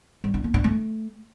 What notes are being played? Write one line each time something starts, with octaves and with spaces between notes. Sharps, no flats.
G3
D4
A#3
D4
A3